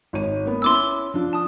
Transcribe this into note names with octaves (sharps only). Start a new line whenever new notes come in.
G#1 C#5 D#7
A#3 B3
C#4 E4 C6 D6 E6
F3 D4 F4
A5 D#6